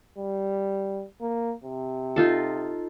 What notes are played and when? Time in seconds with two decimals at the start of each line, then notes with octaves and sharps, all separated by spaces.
0.18 G3
1.21 A#3
1.64 C3
2.16 D#4 F4 A4